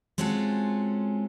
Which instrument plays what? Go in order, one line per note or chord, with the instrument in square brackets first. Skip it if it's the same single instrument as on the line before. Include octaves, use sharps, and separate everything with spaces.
[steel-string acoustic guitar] G#3 C4 C#4 F4 F#4 A4